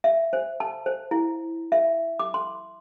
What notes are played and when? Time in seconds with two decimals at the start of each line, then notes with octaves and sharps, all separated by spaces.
0.04 E5
0.33 C5
0.60 A5
0.86 C5
1.11 E4
1.72 E5
2.19 D6
2.34 C6